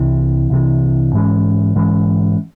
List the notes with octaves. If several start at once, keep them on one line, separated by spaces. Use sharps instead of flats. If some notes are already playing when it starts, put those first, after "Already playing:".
Already playing: C2 C3 E3
C2 C3 E3
G#2 E3 G#3 C#4
G#2 E3 G#3 C#4